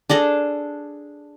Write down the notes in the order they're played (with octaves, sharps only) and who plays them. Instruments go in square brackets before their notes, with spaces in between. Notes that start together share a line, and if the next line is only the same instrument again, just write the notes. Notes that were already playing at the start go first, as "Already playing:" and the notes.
[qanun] D4 G#4 A4